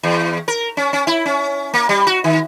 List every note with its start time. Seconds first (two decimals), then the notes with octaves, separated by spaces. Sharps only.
0.03 E2
0.48 A#4
0.77 C#4
0.93 C#4
1.07 E4
1.26 C#4
1.74 A#3
1.89 G3
2.07 F#4
2.24 D#3